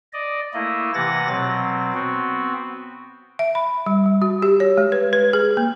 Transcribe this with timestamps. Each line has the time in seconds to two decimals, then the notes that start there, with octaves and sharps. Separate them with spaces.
0.13 D5 D#5
0.54 A3 A#3 E4 D#5
0.94 C3 E3 F#5 A6 A#6
1.28 B2 F#3 C4
1.94 B3 C4 F#4
3.39 E5
3.55 B5
3.86 G3
4.06 G3
4.22 F#4
4.42 G4
4.60 C#5
4.77 G#3
4.92 B4
5.13 B4
5.33 G#4
5.57 A#3